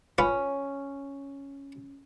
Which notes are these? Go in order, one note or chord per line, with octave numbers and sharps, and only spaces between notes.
C#4 F4 B4 C#5